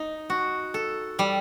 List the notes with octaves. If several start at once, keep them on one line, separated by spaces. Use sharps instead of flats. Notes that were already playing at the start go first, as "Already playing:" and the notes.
Already playing: D#4
F#4
A4
G3